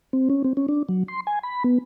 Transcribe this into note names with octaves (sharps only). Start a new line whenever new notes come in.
C4
C#4
C4
C#4
D4
F#3
C6
G#5
B5
B3